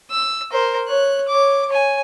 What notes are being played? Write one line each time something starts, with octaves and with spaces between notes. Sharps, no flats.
E6
A#4 C5
C#5 F#6
C#5 D6
C#5 G#5